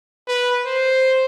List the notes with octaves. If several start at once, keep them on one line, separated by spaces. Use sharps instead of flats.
B4
C5